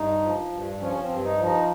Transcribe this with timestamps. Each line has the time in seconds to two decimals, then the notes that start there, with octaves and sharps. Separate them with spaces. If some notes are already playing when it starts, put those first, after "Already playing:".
Already playing: G2 D#4
0.22 F3
0.52 G2
0.80 F3 C#4
1.02 C4
1.09 G2
1.24 D#4
1.38 F3
1.45 D#4